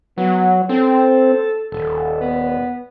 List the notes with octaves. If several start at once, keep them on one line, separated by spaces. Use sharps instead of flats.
F#3 B3
C4 A4
D#1 A4
B3